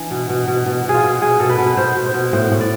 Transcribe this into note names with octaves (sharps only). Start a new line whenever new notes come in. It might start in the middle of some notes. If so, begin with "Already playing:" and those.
Already playing: E3 D4
B2
B2
B2
B2
B2 G#4
F4
B2
B2 G#4
B2 A4
B4
B2
B4
B2 C5
B2
C5
B2
A2 C5
A2
D5